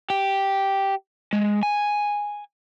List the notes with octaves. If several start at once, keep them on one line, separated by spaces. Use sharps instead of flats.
G4
G#3
G#5